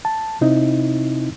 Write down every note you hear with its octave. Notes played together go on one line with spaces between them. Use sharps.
A5
C3 C4 D#4 E4